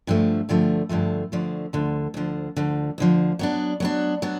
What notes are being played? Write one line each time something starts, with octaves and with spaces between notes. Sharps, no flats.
G2 D3 F3 A3
G2 D3 F3 A3
G2 D3 F3 A3
G2 D3 F3 A3
D2 D3 F3
D2 D3 F3
D2 D3 F3
D2 D3 F3
F#3 B3 D4
F#3 B3 D4
F#3 B3 D4